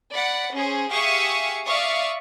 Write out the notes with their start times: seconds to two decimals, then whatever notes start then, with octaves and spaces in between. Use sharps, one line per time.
0.13 D5 F#5 B5
0.54 C#4 G#4 C5
0.91 G4 G#4 E5 F5 C#6 D#6
1.66 D5 E5 F5 C#6 D#6